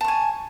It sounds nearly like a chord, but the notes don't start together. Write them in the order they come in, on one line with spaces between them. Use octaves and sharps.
A5 C#6 G#5